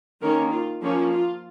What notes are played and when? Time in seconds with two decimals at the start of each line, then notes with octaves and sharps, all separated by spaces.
0.21 D#3 A#3 C#4 A#4
0.52 F4
0.82 F3 A#3 C#4
1.12 F4